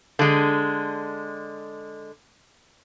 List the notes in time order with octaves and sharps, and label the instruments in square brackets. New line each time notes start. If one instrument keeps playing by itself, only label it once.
[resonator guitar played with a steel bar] D3 G#3